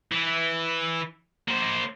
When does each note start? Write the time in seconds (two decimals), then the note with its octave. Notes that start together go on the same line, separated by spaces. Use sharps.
0.12 E3
1.48 A#3 C5